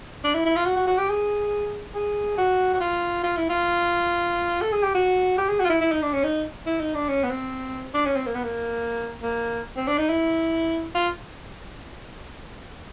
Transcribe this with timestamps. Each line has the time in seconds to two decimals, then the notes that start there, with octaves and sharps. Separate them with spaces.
0.24 D4
0.34 E4
0.45 E4
0.56 F4
0.66 F#4
0.76 F#4
0.87 F#4
0.98 G4
1.09 G#4
1.95 G#4
2.38 F#4
2.74 F#4
2.80 F4
3.23 F4
3.37 E4
3.49 F4
4.61 A4
4.72 G#4
4.83 G4
4.95 F#4
5.38 G4
5.49 G#4
5.60 F#4
5.65 F4
5.69 E4
5.81 E4
5.91 D#4
6.02 D4
6.13 C#4
6.24 D#4
6.66 E4
6.80 D#4
6.95 D4
7.09 C#4
7.24 B3
7.30 C4
7.94 D4
8.06 C#4
8.16 C4
8.27 A#3
8.35 B3
8.44 A#3
9.22 A#3
9.77 C4
9.88 D4
9.98 D#4
10.09 E4
10.95 F4